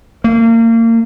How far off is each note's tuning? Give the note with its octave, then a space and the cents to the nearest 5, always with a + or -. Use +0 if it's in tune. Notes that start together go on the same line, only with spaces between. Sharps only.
A#3 -35